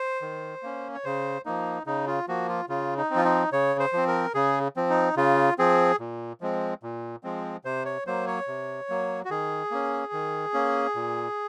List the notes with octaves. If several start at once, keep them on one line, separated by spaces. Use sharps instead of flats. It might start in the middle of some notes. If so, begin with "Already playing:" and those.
Already playing: C5
D#3
A#3 C#4
C#5
C#3 C5
F3 A#3 D#4
C#3 D#4
F4
F3 A#3 F#4
F4
C#3 F4
D#4
C4
F3 F4
D#4
C#3 C#5
C5
F3 C4
A#4
C#3 G#4
F3 C4
D#4
C#3 F4
F3 C4 G#4
A#2
F3 G#3 C4
A#2
F3 G#3 C4
C3 C5
C#5
F#3 A#3 C5
C#5
C3
F#3 A#3
F#4
D#3 G#4
A#3 C#4
D#3
A#3 C#4
A#2